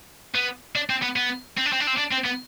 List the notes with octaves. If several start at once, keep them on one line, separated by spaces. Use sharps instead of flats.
B3
D4
C4
B3
B3
C4
D4
C4
D4
C4
D4
C4
B3